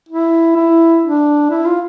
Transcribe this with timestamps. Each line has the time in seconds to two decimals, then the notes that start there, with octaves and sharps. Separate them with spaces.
0.09 E4
0.56 E4
1.03 D4
1.50 E4
1.66 F4